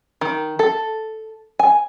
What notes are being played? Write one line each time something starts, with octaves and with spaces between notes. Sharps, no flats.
D#3
A4
G#5